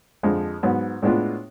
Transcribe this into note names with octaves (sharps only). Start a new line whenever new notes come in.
F2 D3 F3 G#3
G#2 F#3 B3
A2 G#3 B3 D4 F4